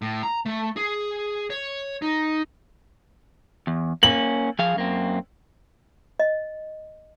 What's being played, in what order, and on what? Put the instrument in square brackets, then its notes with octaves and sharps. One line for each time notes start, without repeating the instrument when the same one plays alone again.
[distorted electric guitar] A2
A#5
A3
G#4
C#5
D#4
[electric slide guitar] E2
[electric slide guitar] A#3 C#4 [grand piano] F#7
[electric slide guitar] F3 G#4 F5
F#2 A#3 C4
[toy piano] D#5